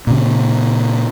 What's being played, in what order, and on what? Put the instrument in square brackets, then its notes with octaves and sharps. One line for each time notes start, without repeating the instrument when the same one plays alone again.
[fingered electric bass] A#2 C#3